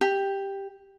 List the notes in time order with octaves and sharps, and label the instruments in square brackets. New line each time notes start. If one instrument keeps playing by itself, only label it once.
[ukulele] G4